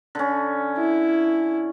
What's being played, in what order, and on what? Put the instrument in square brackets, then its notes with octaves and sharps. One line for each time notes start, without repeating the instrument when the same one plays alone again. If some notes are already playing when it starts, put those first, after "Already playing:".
[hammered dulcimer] D3 C#4
[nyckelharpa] E4